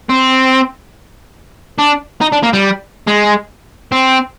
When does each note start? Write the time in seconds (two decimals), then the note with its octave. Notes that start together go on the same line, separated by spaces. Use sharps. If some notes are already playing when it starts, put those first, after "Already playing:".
0.09 C4
1.79 D4
2.21 D#4
2.33 D4
2.44 A#3
2.54 G3
3.07 G#3
3.92 C4